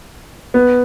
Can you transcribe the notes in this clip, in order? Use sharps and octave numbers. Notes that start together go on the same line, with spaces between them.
B3